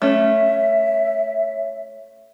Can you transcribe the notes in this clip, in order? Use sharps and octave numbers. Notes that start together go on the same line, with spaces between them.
A3 C#4 C#5 E5